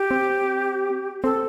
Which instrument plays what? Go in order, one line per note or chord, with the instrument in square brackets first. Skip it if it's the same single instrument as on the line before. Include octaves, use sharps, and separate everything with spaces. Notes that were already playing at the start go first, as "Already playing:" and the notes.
Already playing: [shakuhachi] G4
[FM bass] C4
[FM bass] C4 [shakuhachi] A4